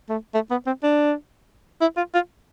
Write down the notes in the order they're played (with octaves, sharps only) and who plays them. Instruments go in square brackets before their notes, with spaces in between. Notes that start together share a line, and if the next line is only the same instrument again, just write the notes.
[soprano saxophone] A3
A3
B3
C4
D4
E4
F4
F4